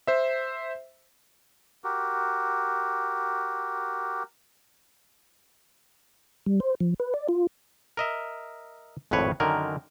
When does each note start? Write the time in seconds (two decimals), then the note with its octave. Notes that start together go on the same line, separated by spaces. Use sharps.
0.07 C5 E5
1.84 F#4 G4 A#4
6.46 G3
6.60 C5
6.80 F3
7.00 B4
7.14 D5
7.29 F4
7.97 A#4 D#5 E5
9.11 G#1 F2 A2 B4 C#5
9.40 F#2 D3 D#3 A#4 G#5